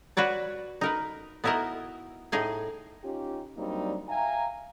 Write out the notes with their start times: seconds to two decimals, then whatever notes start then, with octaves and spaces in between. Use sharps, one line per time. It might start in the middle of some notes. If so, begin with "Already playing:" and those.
0.17 F#4 B4 C#5 D5
0.81 D#4 A#4 B4
1.44 B3 D#4 E4 F#4 A#4 D#5
2.32 A2 D#4 G#4 G#5
3.04 C#4 D#4 F4 G4
3.57 F#3 G3 A#3 C4 D4 D#4
4.09 E5 F5 G5 G#5 A#5